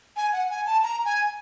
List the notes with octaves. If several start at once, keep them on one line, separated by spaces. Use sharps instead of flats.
G#5
F#5
G#5
A5
A#5
G#5